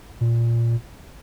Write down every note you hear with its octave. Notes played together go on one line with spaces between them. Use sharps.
A#2